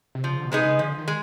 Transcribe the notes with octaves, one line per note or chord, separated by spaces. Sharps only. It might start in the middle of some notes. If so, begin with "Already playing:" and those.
C3
C#3 F3
D3
B2
C3 G#3 B3 D#4 G#4
C#3
D3 F3
D#3
G#3